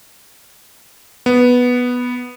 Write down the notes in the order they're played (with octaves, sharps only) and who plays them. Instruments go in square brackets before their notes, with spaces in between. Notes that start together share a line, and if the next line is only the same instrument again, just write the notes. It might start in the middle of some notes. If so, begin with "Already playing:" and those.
[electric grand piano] B3